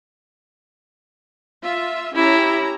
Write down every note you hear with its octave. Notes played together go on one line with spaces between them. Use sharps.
F4 E5
C#4 E4 G4 A#5